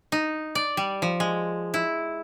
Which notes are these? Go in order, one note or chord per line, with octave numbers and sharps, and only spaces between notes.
D#4
D5
G3
F3
G#3
E4